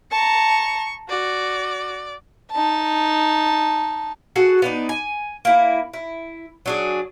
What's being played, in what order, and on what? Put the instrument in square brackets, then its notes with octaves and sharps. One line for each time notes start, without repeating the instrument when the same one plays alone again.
[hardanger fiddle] A5 A#5 [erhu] C#6
[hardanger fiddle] F#4 [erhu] D5
[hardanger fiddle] D#4 A5
[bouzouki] F#4 G#4 A4 F#5
B3 D4 D#4
G#5
A#3 E4
E4
F#3 D4 G#4